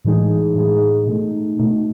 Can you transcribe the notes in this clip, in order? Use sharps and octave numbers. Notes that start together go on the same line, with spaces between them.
A2 E3 G#3 D#4 G#4
A2 E3 G#3 D#4 G#4
B2 A3 D#4
B2 A3 D#4